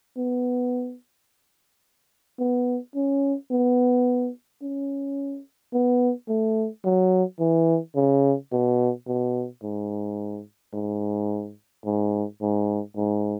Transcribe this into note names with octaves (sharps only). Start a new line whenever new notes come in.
B3
B3
C#4
B3
C#4
B3
A3
F#3
E3
C#3
B2
B2
G#2
G#2
G#2
G#2
G#2